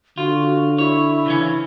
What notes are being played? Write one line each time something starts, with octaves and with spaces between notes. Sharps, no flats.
D3 F4 F#4
E4 C#5
C#3 E3 C#4